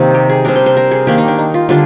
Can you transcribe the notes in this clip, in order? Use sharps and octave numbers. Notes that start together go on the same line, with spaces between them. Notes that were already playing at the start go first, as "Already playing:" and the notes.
Already playing: C3 D#3 A#3 D#4
G4
G#4
C3 G3 D4 A#4
C5
C5
A#4
G#4
D#3 A#3 D4 G4
D#4
D4
D#4
F4
D3 G3 D4 F4